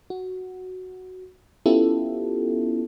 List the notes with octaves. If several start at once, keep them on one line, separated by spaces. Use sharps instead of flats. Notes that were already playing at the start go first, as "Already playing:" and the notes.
F#4
B3 C#4 E4 F4 G4 A4